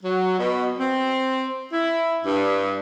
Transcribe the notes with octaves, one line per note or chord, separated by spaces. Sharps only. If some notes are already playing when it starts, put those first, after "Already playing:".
F#3
B2
C4
E4
G2